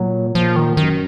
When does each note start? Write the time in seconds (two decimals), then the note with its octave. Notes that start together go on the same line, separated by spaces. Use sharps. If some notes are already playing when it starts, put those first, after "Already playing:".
Already playing: A#2 F#3
0.35 A#2 F3
0.56 D#3
0.77 F#2 D#3